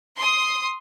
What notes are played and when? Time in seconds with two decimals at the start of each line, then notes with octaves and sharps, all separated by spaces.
0.18 C6 D#6